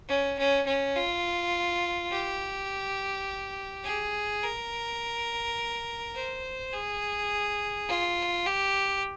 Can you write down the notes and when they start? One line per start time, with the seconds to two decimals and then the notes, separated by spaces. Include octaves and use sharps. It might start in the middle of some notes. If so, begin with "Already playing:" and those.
0.09 C#4
0.39 C#4
0.67 C#4
0.96 F4
2.11 G4
3.85 G#4
4.43 A#4
6.15 C5
6.73 G#4
7.89 F4
8.45 G4